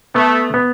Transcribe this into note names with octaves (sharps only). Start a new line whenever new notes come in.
A3 B3
B3